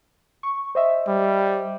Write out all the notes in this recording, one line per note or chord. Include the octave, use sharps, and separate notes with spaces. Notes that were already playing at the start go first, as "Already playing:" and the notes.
C#6
C5 D#5 E5
G3